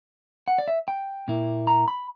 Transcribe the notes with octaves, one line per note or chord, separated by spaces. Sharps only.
F#5
D5
E5
G5
A#2 A#3 E4
A#5
B5